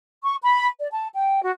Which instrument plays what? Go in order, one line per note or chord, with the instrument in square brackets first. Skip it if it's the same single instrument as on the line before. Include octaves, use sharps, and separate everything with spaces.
[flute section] C#6
B5
D5
A5
G5
F#4